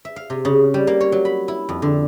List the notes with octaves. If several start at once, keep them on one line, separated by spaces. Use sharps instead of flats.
E5
F5
C3
C#3
G3
A#3
C#5
F#3
B5
E4
F2
D3